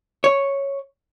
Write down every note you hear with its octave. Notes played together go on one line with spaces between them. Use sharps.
C#5